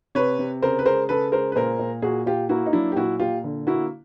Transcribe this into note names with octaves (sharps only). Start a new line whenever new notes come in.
C3 B4 C#5
C3
C#3 A#4 C5
B4
G#3 A#4 C5
C#3 A4 B4
G#3 A#4 C5
B4
A#2 A#4 C5
A#2
A#2 F#4 G#4
A#2 F4 G4
A#3 E4 F#4
D#4
F#3 D4 E4
G4
A#2 E4 F#4
A#2 F4 G4
D3
A#3 E4 F#4